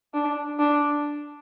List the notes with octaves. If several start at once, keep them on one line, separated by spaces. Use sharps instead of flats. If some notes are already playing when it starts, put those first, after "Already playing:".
D4
D4